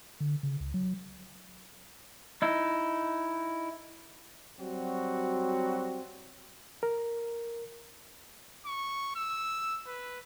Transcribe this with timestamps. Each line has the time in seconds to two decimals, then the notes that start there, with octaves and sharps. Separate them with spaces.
0.20 D3
0.43 C#3
0.60 C#2
0.74 F#3
2.42 D#4 E4
4.60 F#3 G3 C4 F#4
6.83 A#4
8.66 C#6
9.16 E6
9.87 B4